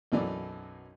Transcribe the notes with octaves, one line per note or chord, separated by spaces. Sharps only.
B1 F#2 E3 D5